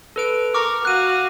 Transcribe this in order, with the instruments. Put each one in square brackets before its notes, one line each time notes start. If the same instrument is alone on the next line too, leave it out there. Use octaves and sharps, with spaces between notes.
[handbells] A4 B4 D7
[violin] A#4 [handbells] A#5 C#6 F6 [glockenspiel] D6
[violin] F#4 F5 [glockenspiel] F#6 D#7